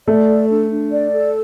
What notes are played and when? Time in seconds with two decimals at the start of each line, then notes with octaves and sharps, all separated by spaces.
0.07 A3 D5
0.28 A4
0.49 D4
0.70 D4
0.92 D5
1.12 A4